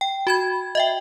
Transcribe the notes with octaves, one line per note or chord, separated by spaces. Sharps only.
G5
F#4 B5 G#6
D#5 E5 G5